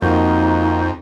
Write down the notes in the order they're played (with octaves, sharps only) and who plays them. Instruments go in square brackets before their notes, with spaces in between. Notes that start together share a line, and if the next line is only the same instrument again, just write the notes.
[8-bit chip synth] F2 [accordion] A#3 F#4 G6 [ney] D#4